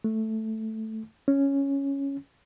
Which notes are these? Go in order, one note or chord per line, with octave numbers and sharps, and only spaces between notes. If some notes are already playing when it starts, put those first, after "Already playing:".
A3
C#4